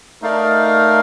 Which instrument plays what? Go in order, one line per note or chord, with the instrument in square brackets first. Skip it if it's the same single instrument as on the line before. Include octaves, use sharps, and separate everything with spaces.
[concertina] A3 D#4 A#4 D5 F5